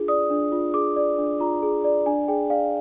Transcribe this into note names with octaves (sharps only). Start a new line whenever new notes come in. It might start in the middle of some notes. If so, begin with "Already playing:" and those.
Already playing: D4 F4 G#4
D5 D#6
D4
F4
G#4 D6
D5
D4
F4 A#5
G#4
D5
D4 G#5
G#4 G5
D5 F5